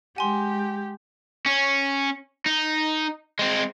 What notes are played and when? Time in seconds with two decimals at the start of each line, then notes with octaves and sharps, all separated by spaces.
0.16 G#3 G4 F#5 G#5 C6
1.46 C#4
2.46 D#4
3.39 G#3 C4